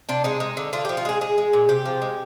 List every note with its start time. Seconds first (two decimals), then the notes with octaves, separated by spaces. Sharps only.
0.09 C3 D4
0.24 G#3 D#4
0.40 G#3
0.57 D3
0.73 D3 F4
0.85 F3 G4
0.97 F4
1.05 G#3 G#4
1.21 G#3 G#4
1.38 G#3
1.53 A#2
1.69 C3 G4
1.85 F3
2.02 G#3